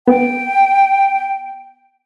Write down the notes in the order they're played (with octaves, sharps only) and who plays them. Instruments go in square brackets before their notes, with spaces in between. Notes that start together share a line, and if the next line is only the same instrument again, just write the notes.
[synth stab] B3 [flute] G5